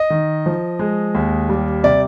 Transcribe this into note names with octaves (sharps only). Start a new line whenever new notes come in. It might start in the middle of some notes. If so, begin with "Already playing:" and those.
Already playing: D#5
D#3
F3
G#3
D#2
G3
C3 D5